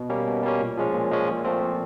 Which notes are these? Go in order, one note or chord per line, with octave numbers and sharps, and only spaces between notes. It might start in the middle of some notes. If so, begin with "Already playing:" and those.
Already playing: B2
G3 A#3 C#4
B2
G3 A#3 C#4
A#2
F3 G#3 C#4
A#2
F3 G#3 C#4
A#2
F3 A3 C4
A#2